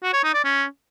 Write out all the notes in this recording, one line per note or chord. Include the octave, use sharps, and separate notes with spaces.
F#4
C#5
D#4
D5
C#4